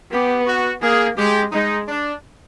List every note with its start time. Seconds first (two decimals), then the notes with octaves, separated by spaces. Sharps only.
0.11 B3 G4
0.46 F#4
0.82 A#3 G#4
1.17 G#3 G4
1.52 G#3 D#4
1.88 D4